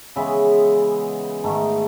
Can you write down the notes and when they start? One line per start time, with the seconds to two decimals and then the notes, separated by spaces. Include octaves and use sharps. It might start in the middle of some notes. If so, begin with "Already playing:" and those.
0.16 C#3 E3 G#3 B3 E5
1.44 G#2 D#3 A3